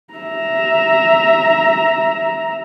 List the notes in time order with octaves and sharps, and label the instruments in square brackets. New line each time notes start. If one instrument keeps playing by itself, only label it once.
[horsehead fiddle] E5 A#5